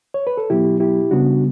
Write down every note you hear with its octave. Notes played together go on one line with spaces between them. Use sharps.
C#5
B4
A4
B2 F#3 B3 E4 G4
E4 G4
C#3 G3 B3 D4 F#4